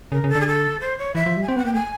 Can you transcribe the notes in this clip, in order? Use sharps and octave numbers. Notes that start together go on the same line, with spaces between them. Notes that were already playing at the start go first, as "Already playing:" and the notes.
C#3 A#4
C#3
A4
D3
G#4
A4
C5
C#5
E3 E5
F3
G3
G#5
C4 G5
B3 F#5
A#3 G5
A3 G#5